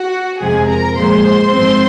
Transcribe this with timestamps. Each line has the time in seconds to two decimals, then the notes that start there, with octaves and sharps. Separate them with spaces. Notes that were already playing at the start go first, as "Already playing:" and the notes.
Already playing: F#4 F#5
0.39 F2 C3 F3 G#3 G#4 G#5
0.68 A#4 A#5
0.96 A#2 F3 G#3 C5 C6
1.52 G#2 F3 C4